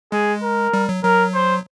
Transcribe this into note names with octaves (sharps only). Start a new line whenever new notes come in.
G#3 G#4
A#4
G3
F#3
F#3 A#4
C5